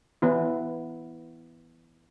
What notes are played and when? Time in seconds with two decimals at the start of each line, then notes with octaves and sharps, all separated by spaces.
0.22 E3 B3 E4